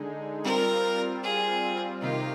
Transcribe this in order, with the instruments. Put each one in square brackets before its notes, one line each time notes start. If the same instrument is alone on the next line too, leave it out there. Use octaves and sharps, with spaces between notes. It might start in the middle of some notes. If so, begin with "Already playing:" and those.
Already playing: [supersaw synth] D3 G#3 D#4 G#4
[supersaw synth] G3 C4 F4 [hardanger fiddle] A#4
[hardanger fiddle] G#4
[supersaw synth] C3 D#3 A#3 D#4 G4 [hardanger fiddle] F4